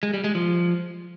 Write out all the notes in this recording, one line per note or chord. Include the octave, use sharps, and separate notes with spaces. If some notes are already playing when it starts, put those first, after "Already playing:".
G#3
G3
G#3
F3